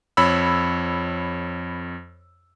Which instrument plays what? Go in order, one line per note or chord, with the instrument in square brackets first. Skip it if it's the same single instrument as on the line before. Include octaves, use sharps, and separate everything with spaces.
[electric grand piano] F2 C#5 B5 E6